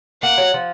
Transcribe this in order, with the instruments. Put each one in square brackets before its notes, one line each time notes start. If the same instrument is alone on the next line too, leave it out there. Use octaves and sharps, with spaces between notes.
[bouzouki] A#3 [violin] F#5
[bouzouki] F#3
F3